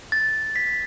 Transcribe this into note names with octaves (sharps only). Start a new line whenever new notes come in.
A6
B6